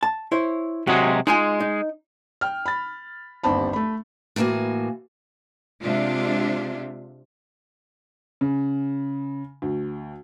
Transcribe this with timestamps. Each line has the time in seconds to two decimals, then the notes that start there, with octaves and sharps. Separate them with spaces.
0.03 A5
0.32 E4 C5 C#5
0.87 C3 F#3 G#3 F#4
1.27 G#3 D#4 F4 G#5
1.60 D#4
2.41 G5 F6
2.66 B5 A6
3.43 G1 D#2 C4 A5 B5
3.73 A3 B5
4.36 A2 E3 A#3 F#4 G#5
5.81 C3 G#3 D4 F4 E5
8.41 C#3
9.62 D2